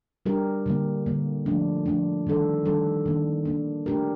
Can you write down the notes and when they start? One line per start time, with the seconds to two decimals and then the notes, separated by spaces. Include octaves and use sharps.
0.26 G3 D4 G4 A#4
0.66 D3 G3 A#3
1.06 D3 G3 A#3
1.46 F3 A3 D4
1.86 F3 A3 D4
2.27 D#3 G3 D4 A4
2.66 D#3 G3 D4 A4
3.06 D#3 A#3 D4
3.45 D#3 A#3 D4
3.86 A3 D4 G4 A#4